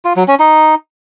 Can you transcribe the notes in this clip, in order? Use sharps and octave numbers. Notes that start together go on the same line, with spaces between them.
F4
F#3
C#4
D#4